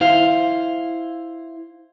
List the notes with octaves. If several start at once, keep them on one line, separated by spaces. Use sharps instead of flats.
E4 C5 F5